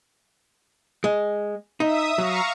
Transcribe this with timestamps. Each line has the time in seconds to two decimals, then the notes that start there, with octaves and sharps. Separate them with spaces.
1.04 G#3
1.80 D#4 E5 D#6
2.18 F#3 F5 A#5 C#6